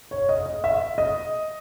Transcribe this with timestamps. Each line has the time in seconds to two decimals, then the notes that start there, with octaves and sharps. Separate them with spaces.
0.11 C#5
0.29 D#5
0.46 D#5
0.64 E5
0.98 D#5